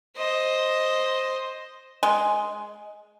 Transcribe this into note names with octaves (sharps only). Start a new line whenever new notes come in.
C5 D#5
G#3